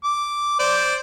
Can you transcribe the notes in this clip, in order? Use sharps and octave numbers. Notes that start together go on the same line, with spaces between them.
D6
C5 D5